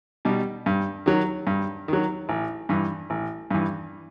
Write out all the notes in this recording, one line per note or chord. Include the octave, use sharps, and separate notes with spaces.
B2 G3 D#4
G2
D#3 F#3
G2
D#3 F#3
A1
G2 E3
A1
G2 E3